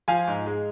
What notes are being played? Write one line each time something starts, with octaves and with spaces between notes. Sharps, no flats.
F3 F5 G#5
G#2
G#3